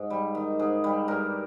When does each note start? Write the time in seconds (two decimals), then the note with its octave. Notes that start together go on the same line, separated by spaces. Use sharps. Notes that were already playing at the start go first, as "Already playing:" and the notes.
Already playing: G#2
0.10 G3
0.35 D#3
0.59 G#2 G#4
0.84 G3
1.08 G2 A#4